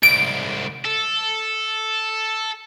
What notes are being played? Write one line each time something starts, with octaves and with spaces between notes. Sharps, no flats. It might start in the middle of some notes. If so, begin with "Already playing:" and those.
C2 G#2 D7
A4